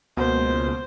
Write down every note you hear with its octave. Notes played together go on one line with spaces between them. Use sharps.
C#2 B2 A#3 C5